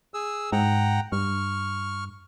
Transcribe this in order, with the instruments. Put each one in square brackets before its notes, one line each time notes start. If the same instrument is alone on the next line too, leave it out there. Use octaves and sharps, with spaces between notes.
[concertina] G#4 E6
[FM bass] G#2 [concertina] F#5 G5 A#5
[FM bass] G2 [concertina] C#6 F6